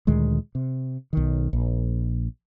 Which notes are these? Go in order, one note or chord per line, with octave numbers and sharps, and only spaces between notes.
D2 A#2 D#3 G#3
C3
B1 D#3
A#1